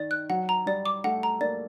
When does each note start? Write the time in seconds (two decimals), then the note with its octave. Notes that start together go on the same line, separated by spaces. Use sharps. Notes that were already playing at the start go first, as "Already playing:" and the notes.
Already playing: D#3 D5
0.11 F#6
0.30 F#3 F#5
0.49 A#5
0.66 G3 D5
0.86 D6
1.04 A3 F#5
1.23 A#5
1.41 A#3 D5